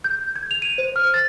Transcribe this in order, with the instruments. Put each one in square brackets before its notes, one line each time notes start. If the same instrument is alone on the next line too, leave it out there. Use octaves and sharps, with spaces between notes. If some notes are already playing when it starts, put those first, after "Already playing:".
[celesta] G6
G#6
F7
D#7
C5
F6
A6